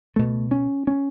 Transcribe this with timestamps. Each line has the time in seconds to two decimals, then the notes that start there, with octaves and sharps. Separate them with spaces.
0.16 C#2 B2 A3
0.51 C#4
0.87 C#4